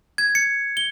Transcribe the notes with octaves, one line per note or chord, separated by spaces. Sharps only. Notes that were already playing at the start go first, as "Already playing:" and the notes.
G#6
C#7
G7